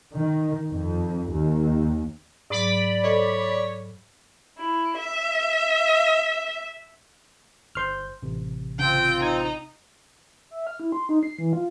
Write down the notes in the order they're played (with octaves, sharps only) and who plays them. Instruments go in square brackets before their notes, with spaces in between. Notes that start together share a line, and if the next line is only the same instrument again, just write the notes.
[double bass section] D#3
F2
D#2
[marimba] G#2 F#3 [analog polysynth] D5 B5
[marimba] A4 C5 D#5 [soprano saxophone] C#5
[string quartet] E4
E5
[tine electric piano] G1 C5 G6 [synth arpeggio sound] C6 F6
[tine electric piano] A1 C3
[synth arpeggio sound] C#3 [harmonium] C4 F4 [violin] G5
[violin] D#4 [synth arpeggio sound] G#6
[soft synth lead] E5
F6
E4
C6
D#4
C7
E3
F4